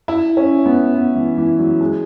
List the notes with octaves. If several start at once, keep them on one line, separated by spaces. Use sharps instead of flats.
E4
C#4
B3
B3
E3
E3
F#3
G#3